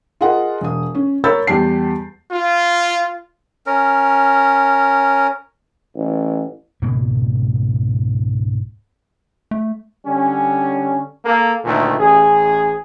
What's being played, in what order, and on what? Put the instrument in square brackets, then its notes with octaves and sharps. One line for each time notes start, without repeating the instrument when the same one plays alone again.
[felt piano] F4 G#4 A#4 D#5 F#5
E1 D#6
C#4
A#4 C#5 B5 E6 G6 A6
E2 G3 G4 A5 C7
[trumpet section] F4
[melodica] C#4 A#4
[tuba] A1
[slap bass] C#2 G#2 B2 A#3
[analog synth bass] A3
[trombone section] D3 G3 C#4
A#3 A4
D2 A#2 D#3 A3
A1 G#4